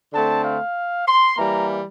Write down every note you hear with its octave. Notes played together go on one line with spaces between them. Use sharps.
D3 A3 C4 A5
F5
C6
E3 G3 A#3 A#5